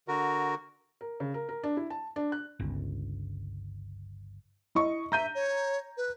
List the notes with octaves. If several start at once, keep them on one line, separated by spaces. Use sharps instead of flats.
D3 F#4 A#4
A#4
C#3
A#4
A#4
D4
E4
A5
D4
F#6
G1 C#2
E4 D#5 C#6
E5 A#5 G6 D#7
C#5
B4